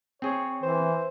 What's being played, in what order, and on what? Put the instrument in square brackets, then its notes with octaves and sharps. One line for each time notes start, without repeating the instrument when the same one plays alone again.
[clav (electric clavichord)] C4 G#4 [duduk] C#5
[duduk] E3 [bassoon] C5